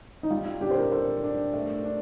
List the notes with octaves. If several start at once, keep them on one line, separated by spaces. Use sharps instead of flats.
D#4
G3 F4
F4
D4 G4
C5
A#4
A4 C5
D4
A3
D4